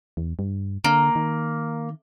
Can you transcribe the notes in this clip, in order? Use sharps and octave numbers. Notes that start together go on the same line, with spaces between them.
E2
G2
D3 A#3
D#3